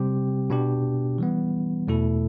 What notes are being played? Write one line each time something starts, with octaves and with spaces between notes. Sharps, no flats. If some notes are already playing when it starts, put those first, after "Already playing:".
Already playing: C3 G3 C4 G4
B2 B3 D4 G4
E3 G3 B3
E2 B2 A3 E4 A4